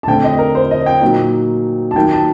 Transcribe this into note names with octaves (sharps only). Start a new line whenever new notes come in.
A5
D3 A3 C4 G5
D#5
A#4
C5
D#5
G5
A#2 F#3 A#3 D#4
A5
D#3 F#3 A#3 D#4 G5
A5